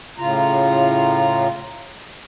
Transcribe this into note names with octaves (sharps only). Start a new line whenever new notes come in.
A2 C#3 F4 A#5